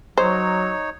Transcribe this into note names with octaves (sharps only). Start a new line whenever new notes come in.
F#3 D#4 C5 C#5